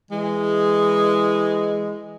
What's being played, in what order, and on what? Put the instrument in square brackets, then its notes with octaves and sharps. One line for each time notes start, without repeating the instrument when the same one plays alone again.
[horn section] E3 G#3